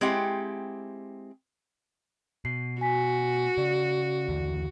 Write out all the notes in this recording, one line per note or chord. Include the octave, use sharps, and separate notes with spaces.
G#3 C4 E4 G4 F#5
B2 C7
F#4 G#5 B6
C#3 D5
D#2 D3 E3